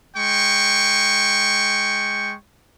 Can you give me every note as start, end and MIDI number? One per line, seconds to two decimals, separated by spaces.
0.17 2.36 56
0.17 2.36 79
0.17 2.36 85